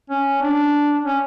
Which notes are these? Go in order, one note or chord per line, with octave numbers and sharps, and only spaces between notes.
C#4
D4
C#4